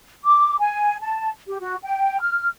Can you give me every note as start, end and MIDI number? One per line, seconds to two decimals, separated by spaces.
0.23 0.57 86
0.59 0.96 80
1.01 1.28 81
1.47 1.58 67
1.60 1.76 66
1.82 2.20 79
2.22 2.47 89